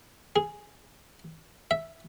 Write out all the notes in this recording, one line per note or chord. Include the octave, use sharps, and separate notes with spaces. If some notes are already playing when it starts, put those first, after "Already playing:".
G#4
E5